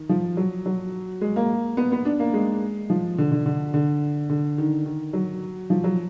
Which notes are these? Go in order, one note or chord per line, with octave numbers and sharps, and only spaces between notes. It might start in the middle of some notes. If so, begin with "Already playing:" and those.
Already playing: D#3
F3
F#3
F#3
G#3
A#3
B3
B3
D4
A#3
G#3
F3
D3
D3
D3
D3
D3
D#3
D#3
F#3
F3
F#3